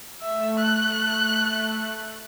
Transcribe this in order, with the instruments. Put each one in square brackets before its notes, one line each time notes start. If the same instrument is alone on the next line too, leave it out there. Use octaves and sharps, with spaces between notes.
[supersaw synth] A3 [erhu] E5
[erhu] F#6